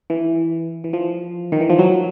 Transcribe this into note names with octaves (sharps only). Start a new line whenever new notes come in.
E3
E3
F3
D#3
E3
F3
F#3